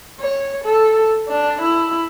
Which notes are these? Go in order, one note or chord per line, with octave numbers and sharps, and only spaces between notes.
C#5
A4
D4
E4